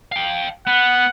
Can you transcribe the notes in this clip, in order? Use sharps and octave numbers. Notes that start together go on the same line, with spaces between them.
F5 G5
B3 F#5